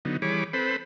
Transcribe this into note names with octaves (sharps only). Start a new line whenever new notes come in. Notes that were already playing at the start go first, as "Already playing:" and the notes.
D3 F#3 B3 D#4
E3 G3 G#4 C#5 B5 D6
C4 A4 B4 C5 B5